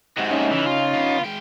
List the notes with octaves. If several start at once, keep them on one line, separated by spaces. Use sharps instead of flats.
G#2 C3 F#4
A#3 C#4 D#4 E5
C#3 E3
F4
D3 B3
G#3 G5